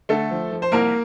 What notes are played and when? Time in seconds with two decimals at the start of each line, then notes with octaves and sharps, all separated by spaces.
0.09 D3 A3 A4
0.31 F3
0.51 F3
0.62 C5
0.72 C2 A#3 A#4